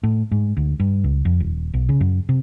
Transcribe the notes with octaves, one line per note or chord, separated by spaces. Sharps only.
A2
G#2
D2
G2
C#2
F2
D#1
B1
C#3
F#2
C3